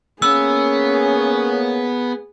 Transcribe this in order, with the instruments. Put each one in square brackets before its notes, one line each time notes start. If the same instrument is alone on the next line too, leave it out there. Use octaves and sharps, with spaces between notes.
[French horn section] A#3 C#4 [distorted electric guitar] B3 [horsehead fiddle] G#4 [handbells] E6